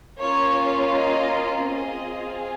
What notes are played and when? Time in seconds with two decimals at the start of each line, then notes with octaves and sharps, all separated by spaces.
0.19 A#3 C#4 F4 C#5
0.93 D#5
1.66 C4 F4 G#4 D#5